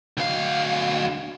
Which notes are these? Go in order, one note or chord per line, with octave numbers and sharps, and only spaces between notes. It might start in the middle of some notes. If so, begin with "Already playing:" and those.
D2 F5